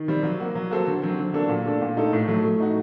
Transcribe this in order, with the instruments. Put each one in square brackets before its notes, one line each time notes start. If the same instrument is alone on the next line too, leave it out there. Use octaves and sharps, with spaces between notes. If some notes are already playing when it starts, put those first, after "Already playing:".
Already playing: [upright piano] D#3
G3 C4
F#3
A#3 F#4
F#3
A#3 F#4 A4 C5
D3
F#3 C4
D3
F#3 A#3 D4 A4
A#2
A3 D4 A4
A#2
A3 D#4 A4
A2
F#3 A3
A3
D#4 F#4